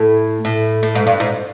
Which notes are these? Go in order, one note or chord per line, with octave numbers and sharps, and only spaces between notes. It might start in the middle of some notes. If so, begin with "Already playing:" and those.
Already playing: A2
A2
A2
G#2
G2
G#2